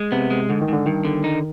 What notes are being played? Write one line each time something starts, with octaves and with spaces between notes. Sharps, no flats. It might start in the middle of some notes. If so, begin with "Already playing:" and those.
Already playing: G#3
C3 B3
G#3
G#2 D3
D#3
G#2 D3
G2 D#3
D3
D#4